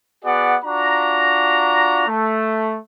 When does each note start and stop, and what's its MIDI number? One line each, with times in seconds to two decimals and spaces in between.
0.25 0.56 59
0.25 0.56 66
0.25 0.56 68
0.25 0.56 74
0.25 0.56 78
0.64 2.03 62
0.64 2.03 65
0.64 2.03 66
0.64 2.03 82
2.07 2.77 57